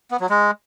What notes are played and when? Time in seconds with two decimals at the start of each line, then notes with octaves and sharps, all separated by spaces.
0.11 B3
0.20 F#3
0.30 G#3